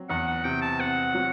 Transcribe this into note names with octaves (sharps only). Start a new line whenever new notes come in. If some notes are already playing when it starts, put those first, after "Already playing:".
Already playing: F#3 C4
E2 F#5
F#5
C3 G5
A5
C4 F#5
F#3